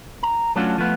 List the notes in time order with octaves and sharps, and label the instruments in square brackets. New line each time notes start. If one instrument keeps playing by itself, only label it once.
[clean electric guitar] A#5
F#3 A3 C#4 D4 F4 F#4
F3 A3 B3 F4